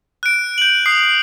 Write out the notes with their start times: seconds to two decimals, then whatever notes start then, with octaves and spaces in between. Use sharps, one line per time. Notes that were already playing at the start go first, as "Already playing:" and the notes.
0.23 F#6 D7
0.58 G6 F#7
0.86 D#6 C7